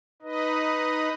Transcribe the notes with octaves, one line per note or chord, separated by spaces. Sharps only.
D#4 B4 D#5